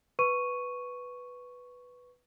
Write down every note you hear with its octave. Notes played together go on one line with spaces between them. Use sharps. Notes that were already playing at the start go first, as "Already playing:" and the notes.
B4 C#6 D#7